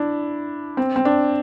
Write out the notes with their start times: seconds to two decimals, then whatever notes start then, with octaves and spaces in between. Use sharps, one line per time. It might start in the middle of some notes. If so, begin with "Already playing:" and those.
Already playing: D4 E4
0.77 C4
0.96 C4
1.05 D4